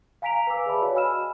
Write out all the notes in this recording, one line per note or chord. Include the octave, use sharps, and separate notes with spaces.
F5 G#5 A#5 B6 D7 F7
B4 F5 G#5 D6 E6
G#4 B4 D5 E5 A5 B5
F#4 C#5 F5
D#5 G#5 B5 E6 F6 E7